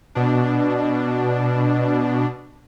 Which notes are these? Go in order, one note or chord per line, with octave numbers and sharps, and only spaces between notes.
B2 D4